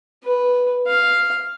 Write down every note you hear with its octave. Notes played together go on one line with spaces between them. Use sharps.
B4
F5